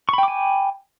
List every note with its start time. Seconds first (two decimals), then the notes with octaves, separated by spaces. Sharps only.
0.09 C#6
0.13 B5
0.18 G5
0.23 D6
0.28 G#5